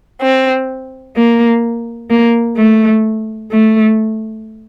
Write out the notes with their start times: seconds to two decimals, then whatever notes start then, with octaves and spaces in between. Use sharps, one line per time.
0.21 C4
1.15 A#3
2.09 A#3
2.57 A3
3.51 A3